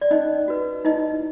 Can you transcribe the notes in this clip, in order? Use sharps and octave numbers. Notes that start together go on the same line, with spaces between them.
D5
C#4 D#4 D#5
F#4 B4
D#4 E4 D#5